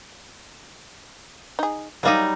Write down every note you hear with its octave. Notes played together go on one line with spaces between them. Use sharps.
D#4 G#4
F#3 G3 A#3 D#4 D#5 F5